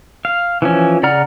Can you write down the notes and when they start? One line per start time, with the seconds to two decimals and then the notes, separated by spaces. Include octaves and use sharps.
0.25 F5
0.62 E3 F3 C#4
1.03 C#3 D5 F#5 A#5 F6